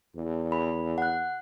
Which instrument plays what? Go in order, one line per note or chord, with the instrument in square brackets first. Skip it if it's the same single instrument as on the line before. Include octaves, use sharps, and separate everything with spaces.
[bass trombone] E2
[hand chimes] B5
F#5 F#6